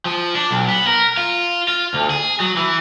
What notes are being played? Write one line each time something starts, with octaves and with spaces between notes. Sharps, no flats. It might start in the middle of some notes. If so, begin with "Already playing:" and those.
F3
D4
B1
B3
A#4
F4
F4
D2
G#4
F#3
E3